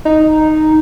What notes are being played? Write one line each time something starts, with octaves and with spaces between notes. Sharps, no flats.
D#4